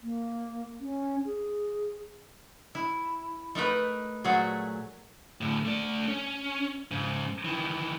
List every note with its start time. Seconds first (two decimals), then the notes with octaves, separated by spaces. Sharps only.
0.02 A#3
0.80 C#4
1.25 G#4
2.75 E4
3.55 A3 D#4 A#4 B4
4.24 A#2 F#3 A3 F#4 G#4
5.41 A2 D3
5.65 A3 D5
6.08 C#4
6.91 G#2 C#3
7.45 D#3 E3